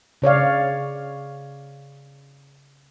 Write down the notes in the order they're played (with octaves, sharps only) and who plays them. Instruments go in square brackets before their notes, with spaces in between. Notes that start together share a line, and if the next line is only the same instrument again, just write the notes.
[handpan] C#3 C#5 D5 F5